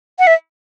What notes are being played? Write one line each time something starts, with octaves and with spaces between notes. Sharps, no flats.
F#5
E5